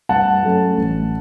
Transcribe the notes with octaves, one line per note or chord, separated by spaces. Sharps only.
G2 F#5 A5
F#3 A3 C#4
A1